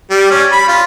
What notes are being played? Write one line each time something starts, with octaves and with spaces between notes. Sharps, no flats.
G3
C#4
B5
F4